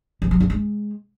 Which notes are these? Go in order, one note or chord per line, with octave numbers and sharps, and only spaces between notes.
E3
F#3
D4
G#3